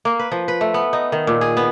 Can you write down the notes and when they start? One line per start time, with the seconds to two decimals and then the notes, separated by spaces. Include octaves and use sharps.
0.05 A#3
0.19 B4
0.32 F3
0.48 B4
0.61 A3
0.74 B3
0.93 D#4
1.12 D#3
1.27 A#2
1.41 G#4
1.57 B3